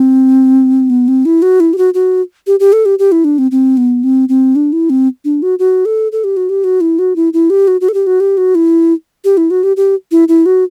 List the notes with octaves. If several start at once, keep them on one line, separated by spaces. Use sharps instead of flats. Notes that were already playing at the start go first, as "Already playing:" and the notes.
Already playing: C4
B3
C4
E4
F#4
E4
G4
F#4
F#4
G4
G4
A4
G4
G4
E4
D4
C4
C4
B3
C4
C4
D4
E4
C4
D4
F#4
F#4
A4
A4
G4
F#4
G4
F#4
E4
F#4
E4
E4
G4
F#4
F#4
A4
G4
F#4
G4
F#4
E4
G4
E4
F#4
G4
G4
E4
E4
F#4